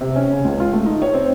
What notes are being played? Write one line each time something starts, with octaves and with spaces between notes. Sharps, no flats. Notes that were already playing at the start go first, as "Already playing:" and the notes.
C3
C#4
C#3
C#2
F4
A3
D#4
C#5
C4